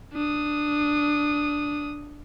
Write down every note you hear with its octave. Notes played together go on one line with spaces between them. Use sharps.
D4 D#6